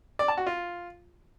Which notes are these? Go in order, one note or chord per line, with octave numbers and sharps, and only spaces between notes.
D5
A5
F#4
F4